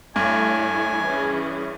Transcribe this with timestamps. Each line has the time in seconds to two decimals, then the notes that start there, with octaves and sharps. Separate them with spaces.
0.16 G2 A3 E4 C#5 G#5
1.04 E3 C#4 G#4